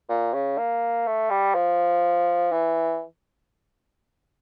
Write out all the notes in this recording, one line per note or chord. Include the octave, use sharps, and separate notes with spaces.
A#2
C#3
A#3
A3
G3
F3
E3